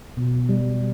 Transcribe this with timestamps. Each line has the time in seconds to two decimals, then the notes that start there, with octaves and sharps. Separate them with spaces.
0.17 B2
0.49 G3